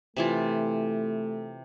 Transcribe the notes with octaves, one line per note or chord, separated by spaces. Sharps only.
C3 E3 A3 F4